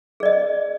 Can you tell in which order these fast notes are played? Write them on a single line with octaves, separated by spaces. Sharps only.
G#4 D5 D#5